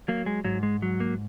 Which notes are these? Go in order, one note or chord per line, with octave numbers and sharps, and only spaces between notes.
F#3 A#3
G#3
G#2 F#3
G#3
F#3
A#3